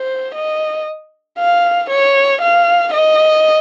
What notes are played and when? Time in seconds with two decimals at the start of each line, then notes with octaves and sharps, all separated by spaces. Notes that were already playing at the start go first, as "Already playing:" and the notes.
Already playing: C5
0.34 D#5
1.38 F5
1.90 C#5
2.41 F5
2.94 D#5